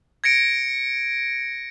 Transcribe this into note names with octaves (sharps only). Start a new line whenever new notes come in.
G#6 A#6 C#7 D7